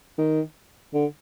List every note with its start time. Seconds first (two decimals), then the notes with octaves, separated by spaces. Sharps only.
0.18 D#3
0.94 D3